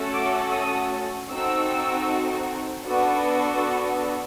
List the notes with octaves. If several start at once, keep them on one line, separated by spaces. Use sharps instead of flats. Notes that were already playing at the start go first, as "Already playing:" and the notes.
Already playing: A3 C#4 F#4 A4
D6
D#6
C4 D#4 F#4 A4 E6
B3 D4 F#4 A4